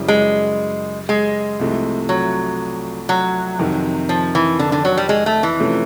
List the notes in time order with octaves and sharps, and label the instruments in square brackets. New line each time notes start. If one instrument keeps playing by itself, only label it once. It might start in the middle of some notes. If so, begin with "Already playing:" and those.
Already playing: [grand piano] F#2 C#3 E3 G3
[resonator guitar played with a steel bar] G#3
G#3
[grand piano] C2 C3 F3 A3
[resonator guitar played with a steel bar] F#3
F#3
[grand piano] F2 C3 D#3
[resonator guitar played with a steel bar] F3
E3
D3
D3
F#3
G3
G#3
A3
E3
[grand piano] C3 F3 A3 C#4